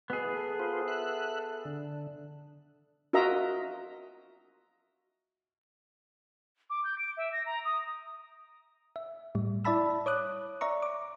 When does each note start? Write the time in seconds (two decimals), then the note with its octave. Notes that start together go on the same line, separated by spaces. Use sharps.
0.10 B2 B3 G#4
0.23 E3
0.36 A4
0.60 F4 B4 C5
0.88 E5 F#6
1.65 D3
3.13 F4 F#4 A#4 D#5 E5 A#5
6.70 D6
6.84 G6
6.98 D7
7.17 E5
7.32 A#6
7.46 A#5
7.65 D#6
8.96 E5
9.35 A2 G3
9.65 E4 D5 E5 A5 B5 E6
10.06 C#5 D6 D#6 F#6
10.61 D5 E5 A#5 C#6
10.82 D6